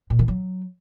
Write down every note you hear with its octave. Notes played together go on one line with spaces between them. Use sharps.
A#2
D#3
F#3